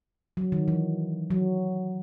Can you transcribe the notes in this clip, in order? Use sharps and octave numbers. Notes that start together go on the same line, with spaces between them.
F#3
D#3
E3
F#3